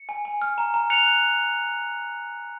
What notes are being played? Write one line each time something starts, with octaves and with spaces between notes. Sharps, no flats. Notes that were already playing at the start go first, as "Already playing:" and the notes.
Already playing: C#7
G#5
G#5
F6
A#5
A#5
F#6 C#7 F7
F#6